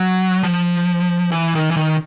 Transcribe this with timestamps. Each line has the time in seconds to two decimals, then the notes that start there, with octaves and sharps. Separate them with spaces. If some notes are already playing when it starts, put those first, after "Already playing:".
Already playing: F#3
0.43 F3
1.32 E3
1.55 D#3
1.71 E3
1.77 D#3